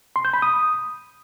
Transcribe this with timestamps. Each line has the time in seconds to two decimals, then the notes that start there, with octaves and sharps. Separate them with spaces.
0.16 C6
0.25 G6
0.33 B5
0.42 D#6